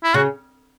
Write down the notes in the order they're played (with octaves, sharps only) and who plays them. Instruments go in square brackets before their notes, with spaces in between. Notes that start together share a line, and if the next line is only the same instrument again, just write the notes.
[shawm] E4
[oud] C#3 [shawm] F#4